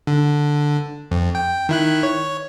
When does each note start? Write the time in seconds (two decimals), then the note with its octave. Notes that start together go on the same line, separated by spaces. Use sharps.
0.07 D3
1.11 F2
1.35 G5
1.69 D#3 E4 F#6
2.03 C#5